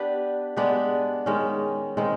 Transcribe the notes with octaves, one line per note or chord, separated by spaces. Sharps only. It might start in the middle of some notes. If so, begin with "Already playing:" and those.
Already playing: B3 D4 G4 B4
G#3 B3 D4 G4
D#3 G#3 C#4
D#3 G#3 C4